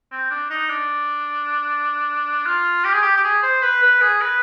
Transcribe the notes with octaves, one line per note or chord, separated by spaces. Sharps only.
C4
D4
D#4
D4
F4
G4
G#4
G4
G4
G#4
C5
B4
B4
G#4
B4